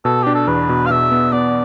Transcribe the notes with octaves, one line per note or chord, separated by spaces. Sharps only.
B2 A4
D4 G4
A4
E2 B4
B2
F5
B2 E5
B3
B3 D5